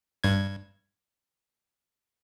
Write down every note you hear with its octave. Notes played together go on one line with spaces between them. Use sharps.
G2 G#6